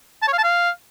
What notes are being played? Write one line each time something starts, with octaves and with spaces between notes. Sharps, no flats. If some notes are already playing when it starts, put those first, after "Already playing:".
A5
C#5
F5
A5
F5